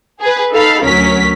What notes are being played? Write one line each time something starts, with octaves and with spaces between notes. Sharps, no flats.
G#4 B4
D#4 A4 F5 B5
D2 F#3 C#4 A#4 B6